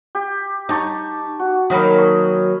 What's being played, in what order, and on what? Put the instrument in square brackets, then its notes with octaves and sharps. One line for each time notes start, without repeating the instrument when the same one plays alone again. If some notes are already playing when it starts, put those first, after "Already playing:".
[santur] G4
[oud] D#4 [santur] G4 A5 C#6
[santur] F#4
[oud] D#3 F#3 A#3 [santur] D#5 F5 B5
[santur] C#5 D#5